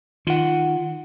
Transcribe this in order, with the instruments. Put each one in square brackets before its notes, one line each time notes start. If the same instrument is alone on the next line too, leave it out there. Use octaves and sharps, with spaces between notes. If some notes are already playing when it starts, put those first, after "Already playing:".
[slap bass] D#3 [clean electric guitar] F4 F#5